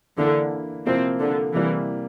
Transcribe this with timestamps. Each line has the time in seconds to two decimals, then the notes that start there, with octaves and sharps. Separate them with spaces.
0.18 D3 E3 A#3 E4
0.86 C3 F3 A#3 C4 E4
1.20 D3
1.55 C3 E3 G3 A#3